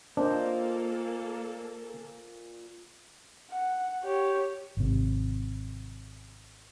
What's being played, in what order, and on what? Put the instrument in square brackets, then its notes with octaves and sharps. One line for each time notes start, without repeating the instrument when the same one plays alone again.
[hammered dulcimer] A#2 [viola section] A#3 A4 [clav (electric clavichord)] D4 [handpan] C5 D#5
[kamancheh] F#5
G4 C#5
[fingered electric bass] G#1 C3